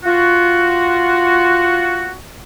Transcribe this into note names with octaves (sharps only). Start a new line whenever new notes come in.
F4 F#4